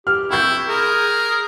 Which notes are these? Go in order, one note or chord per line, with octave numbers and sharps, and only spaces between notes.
G4 F6
C4 E4 C#6 G6
G#4 A#4